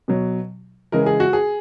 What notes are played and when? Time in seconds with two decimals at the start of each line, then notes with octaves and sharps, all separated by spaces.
0.08 B2 F#3
0.92 C#3 E3 G#3 A#4
1.06 G#4
1.20 F#4
1.33 G#4